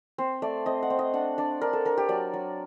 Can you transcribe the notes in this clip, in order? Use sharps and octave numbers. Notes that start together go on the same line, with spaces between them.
C4 C5
A3 D5
C4 D#5
F#5
C4
D#5
D4 F#5
D4 D5
D4 A#4
A4
D4 A#4
G4
F#3 D5
F#3